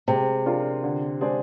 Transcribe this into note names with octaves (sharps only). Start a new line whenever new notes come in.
C3 G#3
D4 F4 A#4
D3
G#3 D4 G#4 C5